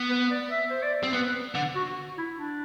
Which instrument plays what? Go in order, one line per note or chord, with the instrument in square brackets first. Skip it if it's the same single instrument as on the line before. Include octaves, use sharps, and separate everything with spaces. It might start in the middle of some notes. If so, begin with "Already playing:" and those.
Already playing: [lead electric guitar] B3
[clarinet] B4
D5
E5
C5
D5
[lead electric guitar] C4
[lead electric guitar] B3 [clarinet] B4
[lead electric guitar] D3
[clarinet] F#4
E4
D4